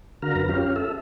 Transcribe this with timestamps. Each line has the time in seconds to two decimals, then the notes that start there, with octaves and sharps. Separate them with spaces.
0.22 D3 F#4 A#4 F5 A#5
0.35 F#2 B4 A#5
0.49 C#4 F4 G4 F5
0.76 A4 E5